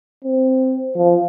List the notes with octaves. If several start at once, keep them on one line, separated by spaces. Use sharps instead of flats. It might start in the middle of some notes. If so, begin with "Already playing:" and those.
C4
F3